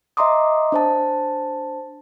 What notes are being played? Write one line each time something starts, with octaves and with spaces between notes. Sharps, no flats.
D#5 E5 A#5 C6 D6 D#6
D4 C5 A5